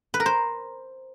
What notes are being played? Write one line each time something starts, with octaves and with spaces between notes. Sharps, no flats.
B4
A#4
C5